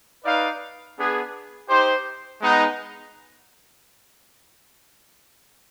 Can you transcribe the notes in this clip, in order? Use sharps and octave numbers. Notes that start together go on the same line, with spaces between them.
D#4 B4 D5 F5
B3 D4 G#4
D#4 G4 C5
G#3 B3 D#4